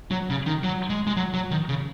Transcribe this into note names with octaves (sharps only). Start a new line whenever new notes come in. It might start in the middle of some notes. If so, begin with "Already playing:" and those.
F#3
C#3
D#3
F#3
G#3
G#3
F#3
F#3
D#3
C#3